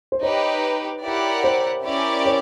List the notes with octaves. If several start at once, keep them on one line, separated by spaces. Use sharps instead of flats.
C5
D#4 G4 B4 C#5
E4 G4 A#4 D5 F#5
C5
C#4 E4 G4 A#4 D5
C#5